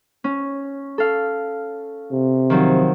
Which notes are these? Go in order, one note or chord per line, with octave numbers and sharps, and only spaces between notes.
C#4
A4 F5
C3
D#3 F3 F#3